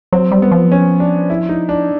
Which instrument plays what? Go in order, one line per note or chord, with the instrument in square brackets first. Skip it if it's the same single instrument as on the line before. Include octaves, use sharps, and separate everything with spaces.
[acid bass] F#3 [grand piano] C4
[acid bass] G3
[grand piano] B3
[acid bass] F3
[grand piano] C#4
D4
E4
D#4
D4